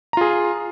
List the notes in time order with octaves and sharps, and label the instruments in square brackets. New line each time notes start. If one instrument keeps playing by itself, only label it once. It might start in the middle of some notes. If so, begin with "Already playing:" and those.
[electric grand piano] A#5
F4
G#4